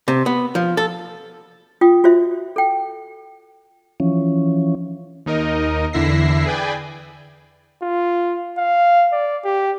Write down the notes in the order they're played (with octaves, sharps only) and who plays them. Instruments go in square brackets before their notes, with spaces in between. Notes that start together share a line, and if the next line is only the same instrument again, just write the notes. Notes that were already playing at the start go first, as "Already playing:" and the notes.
[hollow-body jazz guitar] C3
B3
F3
A4
[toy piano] F4 G5 D#6
F4 F#4 C5 E5
A4 G5
[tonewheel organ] E3 F3 C#4
[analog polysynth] D#2 D#4 A#4 D#5
E2 D3 E4 E5 A#6 C7
G#4 B4 D5 G5 G#5
[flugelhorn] F4
F5
D5
G4